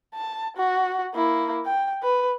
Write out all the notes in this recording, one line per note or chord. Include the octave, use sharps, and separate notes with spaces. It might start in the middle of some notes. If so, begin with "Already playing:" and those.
A5
F#4
A#3 E4
G5
B4